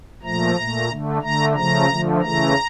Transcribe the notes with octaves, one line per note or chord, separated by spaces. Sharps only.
A#2 F3 A3 A#5
A#2 A3
D3 A3
D3 A3 A#5
C#3 F3 A3 A#5
D3 F3 A3
C#3 E3 A3 A#5